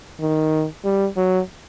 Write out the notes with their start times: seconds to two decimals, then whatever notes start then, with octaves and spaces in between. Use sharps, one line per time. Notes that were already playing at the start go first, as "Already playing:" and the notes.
0.21 D#3
0.85 G3
1.17 F#3